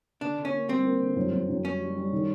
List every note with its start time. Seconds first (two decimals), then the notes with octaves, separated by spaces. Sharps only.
0.21 D3 D4
0.37 D3
0.45 C#4
0.54 A#3
0.69 G3 C4
0.85 A#3
1.01 D3
1.16 F#2
1.32 F#2
1.49 F#2
1.65 G3 C#4
1.81 G3
1.97 G3
2.12 D#3